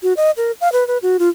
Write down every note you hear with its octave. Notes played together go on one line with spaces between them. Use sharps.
F#4
D#5
A#4
F5
B4
B4
F#4
F4